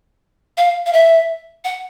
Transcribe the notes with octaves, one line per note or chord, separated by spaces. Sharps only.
F5
F5
E5
F#5